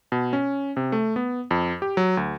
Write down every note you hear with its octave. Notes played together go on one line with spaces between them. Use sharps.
B2
C#4
C3
A3
B3
F2
G4
F#3
D2